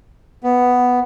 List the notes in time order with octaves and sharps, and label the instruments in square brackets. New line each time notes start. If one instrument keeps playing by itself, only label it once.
[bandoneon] B3